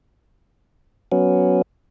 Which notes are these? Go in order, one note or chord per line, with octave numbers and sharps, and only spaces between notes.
F#3 B3 C#4